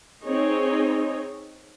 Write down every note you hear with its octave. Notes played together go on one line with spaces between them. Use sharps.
C4 D#4 G#4 C#5 D#5